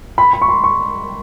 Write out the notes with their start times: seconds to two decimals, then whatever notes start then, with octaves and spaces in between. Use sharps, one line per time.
0.18 B5
0.33 B5
0.42 C#6
0.48 C6
0.64 C#6